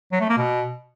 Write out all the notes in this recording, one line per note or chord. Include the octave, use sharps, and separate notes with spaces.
F#3
A3
A#3
B2